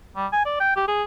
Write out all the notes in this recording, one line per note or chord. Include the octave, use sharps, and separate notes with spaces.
G3
G#5
D5
G5
G4
G#4